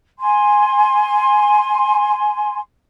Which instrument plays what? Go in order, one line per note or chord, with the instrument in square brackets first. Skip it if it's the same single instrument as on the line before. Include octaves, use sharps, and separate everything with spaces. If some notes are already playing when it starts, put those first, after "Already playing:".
[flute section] G#5 C6